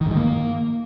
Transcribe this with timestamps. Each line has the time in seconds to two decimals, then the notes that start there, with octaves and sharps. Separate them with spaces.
0.01 D#3
0.06 G#2
0.11 D#3
0.16 A#3